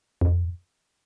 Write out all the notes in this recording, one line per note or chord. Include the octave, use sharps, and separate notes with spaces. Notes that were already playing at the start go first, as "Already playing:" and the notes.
F2